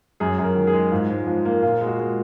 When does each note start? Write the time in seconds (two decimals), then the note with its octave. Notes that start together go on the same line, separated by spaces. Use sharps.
0.20 F#2 G#4
0.39 F#2
0.44 A#4
0.55 D#3
0.67 G#4
0.73 G#3
0.91 G#2 F4
1.10 G#2
1.27 F3
1.45 A#3
1.62 A#2 F4
1.81 G#3
1.87 F#4
1.99 G#3